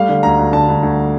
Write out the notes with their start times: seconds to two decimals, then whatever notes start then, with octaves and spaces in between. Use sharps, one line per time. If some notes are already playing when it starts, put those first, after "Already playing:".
Already playing: G3 A3 F5
0.09 D3
0.23 D2 A#5
0.39 D2
0.53 D3 A5
0.68 D2
0.83 D2